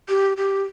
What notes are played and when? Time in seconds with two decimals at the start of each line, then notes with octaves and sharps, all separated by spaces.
0.09 G4
0.37 G4